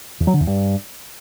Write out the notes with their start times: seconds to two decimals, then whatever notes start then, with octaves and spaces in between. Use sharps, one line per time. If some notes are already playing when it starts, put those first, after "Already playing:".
0.20 E2
0.27 F#3
0.34 D3
0.40 E2
0.47 G2